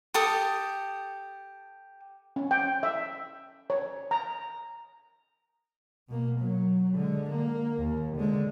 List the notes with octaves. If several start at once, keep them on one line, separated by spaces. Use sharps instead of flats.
G4 A4 D#6
C#4
G5
E5
C#5
A#5
B2 A#3
F#3
D3 G#3
A#3
D#2
D3 G#3